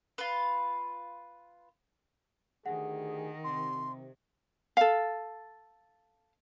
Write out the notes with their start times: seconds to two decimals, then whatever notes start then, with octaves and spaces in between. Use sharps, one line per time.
0.18 F4 B4
2.66 D2 D#3 G4 G#4 F#5
3.44 C3 C6
4.77 A4 F5